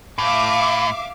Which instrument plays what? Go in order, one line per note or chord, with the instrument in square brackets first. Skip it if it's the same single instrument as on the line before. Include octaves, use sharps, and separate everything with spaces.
[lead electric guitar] A2 [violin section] E5 F5 D6